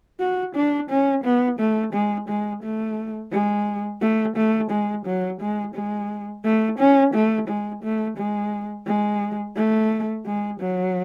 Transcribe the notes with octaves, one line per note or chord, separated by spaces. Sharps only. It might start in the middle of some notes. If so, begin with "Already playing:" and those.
F#4
D4
C#4
B3
A3
G#3
G#3
A3
G#3
A3
A3
G#3
F#3
G#3
G#3
A3
C#4
A3
G#3
A3
G#3
G#3
A3
G#3
F#3